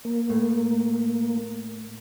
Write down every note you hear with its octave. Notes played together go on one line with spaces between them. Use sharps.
A#3
A2 A3